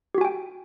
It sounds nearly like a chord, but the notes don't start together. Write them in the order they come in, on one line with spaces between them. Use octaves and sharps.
G4 F#4 G#5 G5